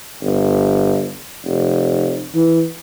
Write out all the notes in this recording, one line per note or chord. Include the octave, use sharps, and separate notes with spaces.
G1
F1
E3